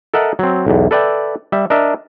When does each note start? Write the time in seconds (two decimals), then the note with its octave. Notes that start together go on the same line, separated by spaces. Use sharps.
0.14 A4 A#4 D#5 E5 F#5
0.39 F#3 C4
0.66 B1 E2
0.91 A4 B4 D5 E5 G5
1.52 G3 E5
1.70 D4 A#4 D#5 E5